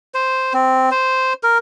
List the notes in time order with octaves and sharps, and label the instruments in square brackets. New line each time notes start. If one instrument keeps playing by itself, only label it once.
[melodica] C5
C4
C5
A#4